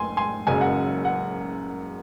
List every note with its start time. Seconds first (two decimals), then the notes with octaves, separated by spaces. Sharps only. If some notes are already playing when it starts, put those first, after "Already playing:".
Already playing: F#1 A3 G#5 C6
0.17 G#5 C6
0.47 F#1 F#2 C#3 G#3 G#5
0.61 F#5
1.05 F#5